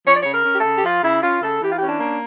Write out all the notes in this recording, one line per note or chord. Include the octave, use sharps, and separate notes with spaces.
F3 C#5
D5
C#3 C#5
A#4
C#4
G4
A4
C#3
G4
F3 F4
C#3 E4
C#4 F4
C#3 A4
E3 G4
F4
C#4 G4
D4
A#3